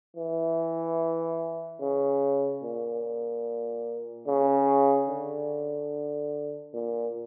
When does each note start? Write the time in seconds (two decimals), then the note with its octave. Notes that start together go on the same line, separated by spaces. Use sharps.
0.16 E3
1.81 C#3
2.63 A#2
4.27 C#3
5.08 D3
6.74 A#2